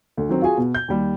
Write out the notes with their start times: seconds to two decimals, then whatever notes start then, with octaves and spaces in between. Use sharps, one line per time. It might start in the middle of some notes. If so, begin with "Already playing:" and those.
0.17 D2
0.29 D#3 F#3 C4
0.42 F4 F#4 G#4 G#5
0.57 B2
0.74 G6
0.88 D#2 G3